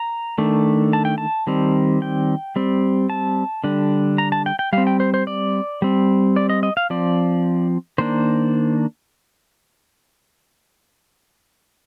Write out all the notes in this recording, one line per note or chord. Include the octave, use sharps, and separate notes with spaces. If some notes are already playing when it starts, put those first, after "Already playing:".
Already playing: A#5
D#3 A3 D4
A5
G5
A5
D#3 G3 C4
G5
G3 C4
A5
D3 G3 D4
A#5
A5
G5
G5
G3 C4 F5
G5
C5
C5
D5
G3 C4
D5
D#5
D#5
F5
F3 C4 D5
D#3 A#3 D4 C5